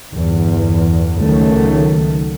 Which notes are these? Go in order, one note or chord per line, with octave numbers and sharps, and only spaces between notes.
G1 E2
C#2 D#3 F#3 A3